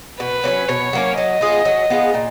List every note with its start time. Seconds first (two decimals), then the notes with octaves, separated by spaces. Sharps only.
0.20 B2 B4
0.44 F#3 A#3 C#4
0.69 B2 C#5
0.93 F#3 A#3 C#4
1.17 F#3 D#5
1.41 B3 F4 G#4
1.65 F#3
1.90 B3 F4 G#4
2.14 A#2